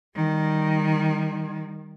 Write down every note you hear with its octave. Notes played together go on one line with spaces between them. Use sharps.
D#3 G3